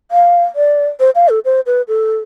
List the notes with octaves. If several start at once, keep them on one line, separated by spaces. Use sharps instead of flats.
F5
D5
C5
F5
A4
C5
B4
A4